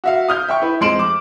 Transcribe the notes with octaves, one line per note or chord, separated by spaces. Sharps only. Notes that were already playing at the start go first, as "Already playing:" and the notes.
F#4 E5 F5
D#6 F6 G6
E5 G5 C#6
E4 B4
F2 G#3 C6 D7 E7 F#7
D6